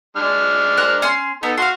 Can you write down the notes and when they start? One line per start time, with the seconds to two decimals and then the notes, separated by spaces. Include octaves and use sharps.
0.16 G#3 D4 F6
0.77 A#4 C5 F#6
1.02 C#4 C6
1.43 B3 D#4 A4
1.58 F#4 F5 C6